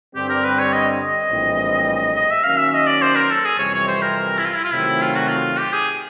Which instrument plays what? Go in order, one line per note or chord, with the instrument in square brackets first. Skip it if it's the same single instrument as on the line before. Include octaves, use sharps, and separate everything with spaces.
[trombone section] G2 D3 G3 C4 [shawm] G4
[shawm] A#4
B4
C#5
D#5
D#5
[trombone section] A#1 A2 E3 G3 C4
[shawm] D#5
E5
[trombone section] D#3 F#3 A#3 C#4 [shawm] F5
[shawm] E5
D#5
D5
C5
A#4
A4
G#4
[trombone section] F2 C3 E3 G3 [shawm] C#5
[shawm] C#5
C5
A#4
E4
F4
E4
F4
[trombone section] C3 D#3 F#3 A3 C4 [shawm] E4
[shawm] F4
F#4
F4
G4
G#4